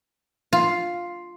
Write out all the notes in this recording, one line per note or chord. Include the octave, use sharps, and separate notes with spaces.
F4